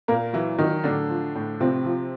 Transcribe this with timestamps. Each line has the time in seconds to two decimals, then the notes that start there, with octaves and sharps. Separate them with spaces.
0.08 A#2 A#3 A#4
0.33 E3 F#3 E4
0.58 D#3 F#3 D#4
0.84 A2 D3 D4
1.09 F3
1.35 A2
1.60 C3 F3 C4
1.85 F3